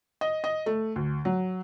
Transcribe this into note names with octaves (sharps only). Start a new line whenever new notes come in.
D#5
D#5
A3
D2
F#3